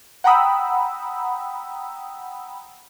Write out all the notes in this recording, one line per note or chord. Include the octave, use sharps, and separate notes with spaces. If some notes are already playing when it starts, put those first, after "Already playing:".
F#5 G5 A#5 B5 D#6 E6